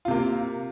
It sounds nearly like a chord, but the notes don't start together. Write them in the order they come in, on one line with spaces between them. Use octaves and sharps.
F4 C3 A#3